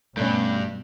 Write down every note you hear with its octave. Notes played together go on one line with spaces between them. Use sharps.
G2 B2 A3 C#4